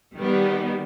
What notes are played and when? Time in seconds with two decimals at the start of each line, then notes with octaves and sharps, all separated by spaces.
0.15 D#3 G3 B3